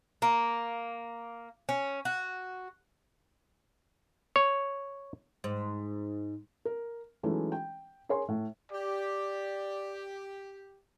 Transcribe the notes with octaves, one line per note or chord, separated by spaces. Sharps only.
A#3
C#4
F#4
C#5
G#2
A#4
E3 F#3 G#3 A3 C#4 D#4
G5
G#4 A#4 C#5 G#5 C6
A2
G4 D5